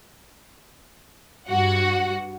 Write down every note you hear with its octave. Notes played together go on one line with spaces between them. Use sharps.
G2 F#4 F#5